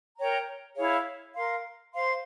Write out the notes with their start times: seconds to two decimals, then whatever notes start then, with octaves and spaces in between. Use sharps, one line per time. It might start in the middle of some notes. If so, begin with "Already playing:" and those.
0.17 A#4 C#5 G5 A#5
0.76 E4 G#4 C#5 F5
1.34 A#4 F5 C6
1.92 C5 F5 C6